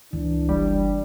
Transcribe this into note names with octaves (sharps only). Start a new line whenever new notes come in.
C#2 E3 D4
F#1 G3